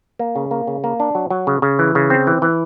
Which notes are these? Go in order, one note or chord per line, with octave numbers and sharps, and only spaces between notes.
A#3
C#3
A#3
C#3
A#3
D4
F#3
F#3
C#3
C#3
E3
C#3
C4
E3
E3